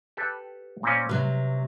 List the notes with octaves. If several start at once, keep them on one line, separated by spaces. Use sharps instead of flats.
G4 A4 B4
A#2 C4 C#4
C3 F#3 B4